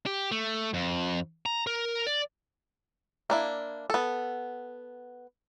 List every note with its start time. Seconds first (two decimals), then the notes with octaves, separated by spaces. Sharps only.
0.06 G4
0.31 A3
0.74 F2
1.46 A#5
1.67 A#4
2.07 D5
3.30 A#3 D4 E4
3.90 B3 A4